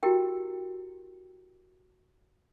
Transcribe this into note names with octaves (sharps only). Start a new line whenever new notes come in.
E4 F#4 G4 A#4 G5